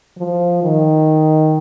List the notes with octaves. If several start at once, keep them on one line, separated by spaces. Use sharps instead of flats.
F3
D#3